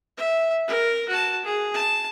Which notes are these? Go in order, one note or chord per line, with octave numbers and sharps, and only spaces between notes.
E5
A#4
F#4 A5
G#4
A5